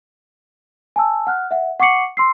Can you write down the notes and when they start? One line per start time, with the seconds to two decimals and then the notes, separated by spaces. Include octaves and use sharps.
0.96 G#5 A5 E6
1.27 F#5 F6 F#6
1.51 E5 F#5
1.80 F#5 C#6 D6 C7 C#7 F#7
2.17 C6 E6 C7